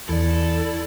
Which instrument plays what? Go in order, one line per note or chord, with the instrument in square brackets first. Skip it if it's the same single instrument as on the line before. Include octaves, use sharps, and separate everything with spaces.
[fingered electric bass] E2 [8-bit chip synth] E4 D5 [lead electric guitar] A4